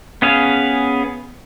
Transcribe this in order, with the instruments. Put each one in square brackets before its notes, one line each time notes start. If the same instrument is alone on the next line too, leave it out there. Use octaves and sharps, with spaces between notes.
[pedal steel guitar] B3 C#4 G#4 F5